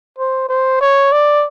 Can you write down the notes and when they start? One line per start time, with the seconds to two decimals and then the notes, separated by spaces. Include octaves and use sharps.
0.18 C5
0.49 C5
0.81 C#5
1.12 D5